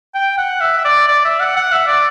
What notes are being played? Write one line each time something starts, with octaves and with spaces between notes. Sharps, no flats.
G5
F#5
E5
E5
D5
D5
E5
F#5
F#5
E5
D5